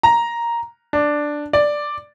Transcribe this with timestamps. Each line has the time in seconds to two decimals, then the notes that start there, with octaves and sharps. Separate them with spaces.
0.03 A#5
0.93 D4
1.53 D5